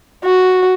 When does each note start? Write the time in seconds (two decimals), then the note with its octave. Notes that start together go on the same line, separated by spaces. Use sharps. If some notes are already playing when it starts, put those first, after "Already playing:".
0.25 F#4